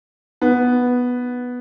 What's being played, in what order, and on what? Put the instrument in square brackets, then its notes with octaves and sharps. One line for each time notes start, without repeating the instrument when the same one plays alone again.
[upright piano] B3